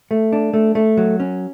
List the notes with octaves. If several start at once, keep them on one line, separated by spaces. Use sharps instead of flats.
A3
D4
A3
A3
F#3
C#4